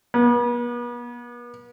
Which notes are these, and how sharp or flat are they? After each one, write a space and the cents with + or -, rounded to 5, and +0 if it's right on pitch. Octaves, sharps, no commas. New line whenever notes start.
B3 -40